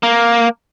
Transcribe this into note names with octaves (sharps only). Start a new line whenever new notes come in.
A#3